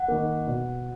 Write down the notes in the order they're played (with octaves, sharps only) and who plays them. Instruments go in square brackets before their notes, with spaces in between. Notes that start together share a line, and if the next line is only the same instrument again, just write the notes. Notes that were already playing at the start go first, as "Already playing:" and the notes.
Already playing: [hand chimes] F#5
[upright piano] D#3 A#3
B2